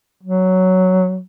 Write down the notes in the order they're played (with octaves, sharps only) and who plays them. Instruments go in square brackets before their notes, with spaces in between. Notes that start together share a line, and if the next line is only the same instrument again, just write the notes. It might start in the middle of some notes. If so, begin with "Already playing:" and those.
[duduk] F#3